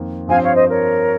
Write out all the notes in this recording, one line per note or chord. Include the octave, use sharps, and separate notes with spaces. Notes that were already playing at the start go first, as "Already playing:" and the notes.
Already playing: F2 D#3 A#3
G2 F3 C4 F5 G#5
C#5 F5
C5 D#5
A#4 C#5